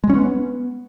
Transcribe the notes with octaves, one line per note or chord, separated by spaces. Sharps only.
G#3
C#4
B3